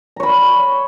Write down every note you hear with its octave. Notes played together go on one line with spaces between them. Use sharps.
C#5 A#5 B5